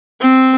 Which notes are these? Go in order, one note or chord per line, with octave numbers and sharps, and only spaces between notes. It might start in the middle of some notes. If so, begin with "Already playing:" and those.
C4